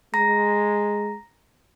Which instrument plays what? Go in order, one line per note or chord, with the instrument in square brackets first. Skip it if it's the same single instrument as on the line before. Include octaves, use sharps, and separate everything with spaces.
[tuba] G#3 [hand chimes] A#5 A#6